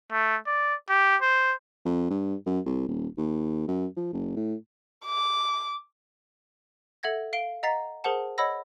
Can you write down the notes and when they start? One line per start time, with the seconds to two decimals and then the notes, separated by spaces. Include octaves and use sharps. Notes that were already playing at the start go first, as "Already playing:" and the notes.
0.12 A3
0.47 D5
0.89 G4
1.22 C5
1.85 F2
2.10 G2
2.46 F#2
2.65 C2
2.88 D#1
3.17 D#2
3.68 F#2
3.97 F3
4.13 F#1
4.36 A2
5.06 D6
7.03 A4 E5 F#5 G#6 A#6
7.33 F5 C7 D7 G7
7.63 D#5 F#5 A#5 A6 B6 C7
8.04 G#4 A#4 C5 F#5 A5
8.38 C#5 D#5 F#5 B5 E6 A#6